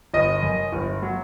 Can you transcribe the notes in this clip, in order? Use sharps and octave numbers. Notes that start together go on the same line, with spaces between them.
G1 D#5
F#2
G1
F#3